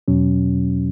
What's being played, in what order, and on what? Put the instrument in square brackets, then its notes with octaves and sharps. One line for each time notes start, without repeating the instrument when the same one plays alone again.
[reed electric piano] E2 B2 F#3 C#4